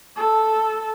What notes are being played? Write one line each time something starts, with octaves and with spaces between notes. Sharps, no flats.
A4